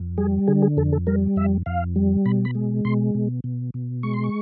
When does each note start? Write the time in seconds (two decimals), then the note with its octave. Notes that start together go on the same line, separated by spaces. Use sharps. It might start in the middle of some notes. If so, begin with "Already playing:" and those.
Already playing: F2
0.18 G3 G#4
0.48 D3 G#4
0.62 G#4
0.77 F2 A4
0.92 A4
1.07 G3 A#4
1.36 F2 E5
1.66 F2 F5
1.96 G3
2.25 B2 B5
2.45 B5
2.55 G#3
2.85 B2 C6
3.15 B2
3.44 B2
3.74 B2
4.03 G#3 C#6
4.14 C6
4.24 C#6